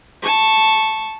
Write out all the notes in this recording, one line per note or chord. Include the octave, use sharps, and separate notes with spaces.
A5 C#6